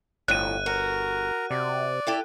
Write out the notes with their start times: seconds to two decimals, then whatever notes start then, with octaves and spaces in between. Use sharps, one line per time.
0.28 G1 F2 A2 F#6 D#7
0.66 F#4 A#4
1.51 C3 D5
2.07 E4 G4 A4